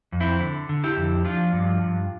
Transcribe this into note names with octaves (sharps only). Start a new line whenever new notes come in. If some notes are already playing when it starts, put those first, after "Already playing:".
F2
C4 E4
D3
D3
E4 G4
F2
F3 D4 F4
G2
G2